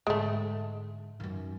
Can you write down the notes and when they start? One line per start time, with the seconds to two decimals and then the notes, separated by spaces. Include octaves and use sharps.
0.07 G#2 D3 G#3 A3
1.20 F#2 D#3